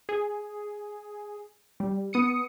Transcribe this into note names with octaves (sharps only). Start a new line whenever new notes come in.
G#4
G3
B3 D#6 C#7